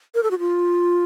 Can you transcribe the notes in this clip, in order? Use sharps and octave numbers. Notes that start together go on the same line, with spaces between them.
A#4
A4
F#4
F4